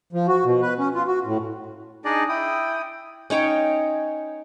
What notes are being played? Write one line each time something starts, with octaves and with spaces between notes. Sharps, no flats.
F3
F#4
B2
B4
C#4
F4
F#4
A2
D4 D#4 G#4 D5 D#5
E4 G5 D#6
C#4 D#4 C#5 G5